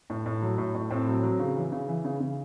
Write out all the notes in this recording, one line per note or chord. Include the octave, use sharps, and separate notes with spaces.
A2
A2
F#3
A2
A2
A2 C4
F#3
F#3
C#3
E3
C#3
E3
C#3
C#3